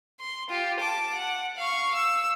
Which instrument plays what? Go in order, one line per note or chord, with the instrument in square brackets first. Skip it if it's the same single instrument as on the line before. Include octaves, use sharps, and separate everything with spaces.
[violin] C6
F4 G4
A5 D6
F#5
F5 C#6
E6